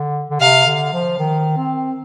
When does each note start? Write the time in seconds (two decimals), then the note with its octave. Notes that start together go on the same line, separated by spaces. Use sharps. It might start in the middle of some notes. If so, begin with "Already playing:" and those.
Already playing: D3
0.30 D3
0.40 C3 F5
0.66 D3
0.93 F3
1.18 D#3
1.57 C4